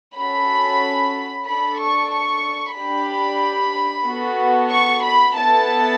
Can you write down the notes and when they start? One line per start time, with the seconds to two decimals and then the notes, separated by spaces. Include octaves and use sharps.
0.16 C#4 F#4 A4 B5
1.46 D4 A4 B5
1.78 C#6
2.12 C#6
2.76 D4 G4 B5
4.06 B3 F#4 A4
4.71 C#6
5.03 B5
5.36 B3 E4 A4 A5